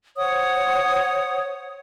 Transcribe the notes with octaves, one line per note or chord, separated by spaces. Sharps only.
C5 C#5 F#5 D#6